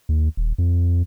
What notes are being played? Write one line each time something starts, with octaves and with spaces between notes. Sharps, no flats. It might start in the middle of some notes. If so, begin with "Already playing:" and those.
D#2
D#1
F2